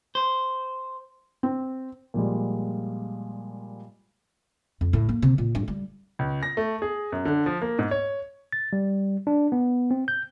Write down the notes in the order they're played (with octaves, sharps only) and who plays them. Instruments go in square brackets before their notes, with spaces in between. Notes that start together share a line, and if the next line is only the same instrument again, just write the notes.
[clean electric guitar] C5
[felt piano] C4
[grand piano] A#2 F3 G3 G#3
[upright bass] F2
A2
A#3
C3
A#2
G2
G3
[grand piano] C#2
A#6
A3
G#4
F#2
D3
F3
A#3
G#2
C#5
[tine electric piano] A6
G3
D4
B3
C4
G6